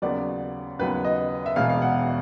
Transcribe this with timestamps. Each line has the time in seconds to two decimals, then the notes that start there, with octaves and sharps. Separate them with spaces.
0.02 D#2 C#3 F#3 B3 D5
0.79 D#2 C#3 F#3 B3 B4
1.05 D#5
1.46 E5
1.56 E1 E2 B2 F5
1.70 F5
1.82 F#5